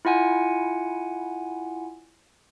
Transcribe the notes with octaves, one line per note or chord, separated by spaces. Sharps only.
E4 F4 F#5 G#5